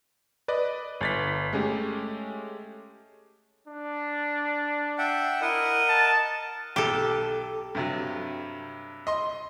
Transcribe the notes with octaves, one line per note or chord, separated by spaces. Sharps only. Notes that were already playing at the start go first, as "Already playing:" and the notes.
B4 D5 D#5
G1 A6 B6
G#3 A3 C#4 G4
D4
E5 F#5 G5
E4 A#4 D#5 F#5
A5
B1 G4 A4
G2 C3 F#3
D#5 C6